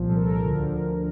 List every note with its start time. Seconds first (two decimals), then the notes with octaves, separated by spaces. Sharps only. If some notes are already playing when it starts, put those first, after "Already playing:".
Already playing: C2 A#2 F3
0.09 A4
0.16 A#4
0.44 D2 D3 F3